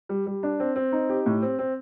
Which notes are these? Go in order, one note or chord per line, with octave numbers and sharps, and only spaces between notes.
G3
G3
D4
C4
C4
D#4
G4
A2
C4
C4